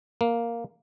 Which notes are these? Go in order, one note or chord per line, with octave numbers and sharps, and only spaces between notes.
A#3